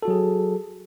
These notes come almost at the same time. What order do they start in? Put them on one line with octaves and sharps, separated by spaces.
A4 F#4 F#3 G#4